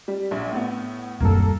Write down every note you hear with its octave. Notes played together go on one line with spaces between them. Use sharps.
G3
A#1
A2 B3
D#1 F#2 G3 A#3 A4